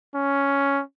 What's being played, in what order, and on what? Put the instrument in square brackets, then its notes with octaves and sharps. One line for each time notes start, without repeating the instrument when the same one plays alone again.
[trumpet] C#4